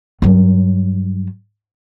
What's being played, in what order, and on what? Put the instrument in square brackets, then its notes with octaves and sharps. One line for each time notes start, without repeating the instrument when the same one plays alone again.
[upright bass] G2 F#3